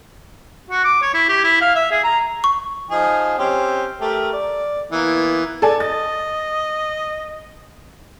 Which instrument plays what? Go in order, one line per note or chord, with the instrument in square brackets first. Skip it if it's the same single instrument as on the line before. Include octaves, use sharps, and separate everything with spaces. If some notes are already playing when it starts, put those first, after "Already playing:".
[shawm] F#4
D6
C#5
E4
G4
E4
F5
E5
G#4
A#5
[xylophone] C#6
[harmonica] F3 D#4 G#4
C4 C#4 G4
A3 G4 A#4
D5
E3 A#3 B3
[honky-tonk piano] A4 D5 G#5
[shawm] D#5 [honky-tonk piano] A6